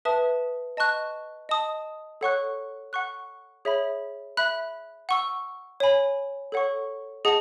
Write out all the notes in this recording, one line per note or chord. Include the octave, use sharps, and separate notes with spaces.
B4 E5 A5 D#6
D#5 A5 C#6 F#6
D#5 A5 D#6
A4 C#5 F#5 C#6 F#6
F#5 C#6 F#6
G#4 C#5 E5 B5
E5 B5 F#6
F#5 C#6 E6
C#5 G#5 B5
A4 C#5 F#5 C#6
G#4 D#5 F#5 A5 D#6